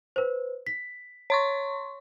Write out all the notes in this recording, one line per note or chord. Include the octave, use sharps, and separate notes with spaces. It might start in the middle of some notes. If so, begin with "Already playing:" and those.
B4 C5
B6
C#5 C6 C#6